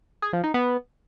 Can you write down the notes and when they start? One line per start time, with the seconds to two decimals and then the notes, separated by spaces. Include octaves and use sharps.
0.22 G#4
0.33 F3
0.44 D#4
0.54 B3